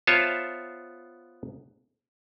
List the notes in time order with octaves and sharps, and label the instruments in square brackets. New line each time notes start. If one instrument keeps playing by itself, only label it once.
[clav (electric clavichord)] B3 F4 C5 C#5 E5 A5